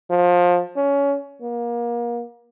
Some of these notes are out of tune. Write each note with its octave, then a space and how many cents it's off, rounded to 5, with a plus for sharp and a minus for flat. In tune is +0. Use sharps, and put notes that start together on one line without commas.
F3 +20
C#4 +20
A#3 +30